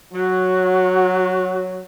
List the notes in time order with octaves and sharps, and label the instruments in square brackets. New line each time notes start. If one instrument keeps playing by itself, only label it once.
[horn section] F#3 [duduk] F#4